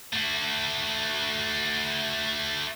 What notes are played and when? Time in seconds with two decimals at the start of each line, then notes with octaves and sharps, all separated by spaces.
0.13 A3 F#4